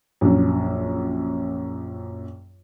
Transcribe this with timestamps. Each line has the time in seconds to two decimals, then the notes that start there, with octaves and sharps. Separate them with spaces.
0.21 A#1 F#2